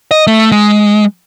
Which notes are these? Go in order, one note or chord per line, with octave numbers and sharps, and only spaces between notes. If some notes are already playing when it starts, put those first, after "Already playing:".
D#5
A3
G#3